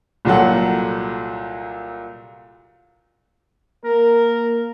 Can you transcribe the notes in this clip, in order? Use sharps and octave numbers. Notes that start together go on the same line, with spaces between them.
C2 A#2 F#3 A4 F#5
A#3 A#4